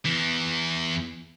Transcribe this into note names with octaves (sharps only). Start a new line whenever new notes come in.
E2 E3